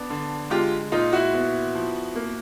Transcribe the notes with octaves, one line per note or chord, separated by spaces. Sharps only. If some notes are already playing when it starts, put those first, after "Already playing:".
Already playing: B3 D4
D3
G#3 F4 G4
A#2 D#4 F4
E4 F#4
B3
F3
A#3